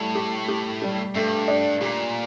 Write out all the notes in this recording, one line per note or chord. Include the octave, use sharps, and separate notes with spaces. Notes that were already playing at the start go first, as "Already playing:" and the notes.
Already playing: A2 G3
G4
G4
G3
G2 A3
D4
A#2 G4